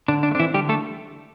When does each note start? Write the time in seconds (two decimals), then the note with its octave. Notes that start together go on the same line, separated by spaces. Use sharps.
0.08 D3 D4
0.23 D4
0.31 A3
0.35 E3 C4 D4 E4
0.54 D3 G3 G4
0.69 A3 A4